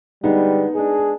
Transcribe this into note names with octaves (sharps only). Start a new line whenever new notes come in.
D3 G3 G#3 B3 D#4
G#3 D4 G#4